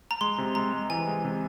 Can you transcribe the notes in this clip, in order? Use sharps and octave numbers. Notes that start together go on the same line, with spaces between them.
A#5
G#3 C6
C3
G#3 A#5
G#3
E3 G#5
G#3
C3